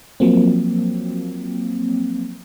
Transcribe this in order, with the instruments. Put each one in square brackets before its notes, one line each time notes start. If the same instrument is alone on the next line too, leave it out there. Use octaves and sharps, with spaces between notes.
[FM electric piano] F3 F#3 A#3 C4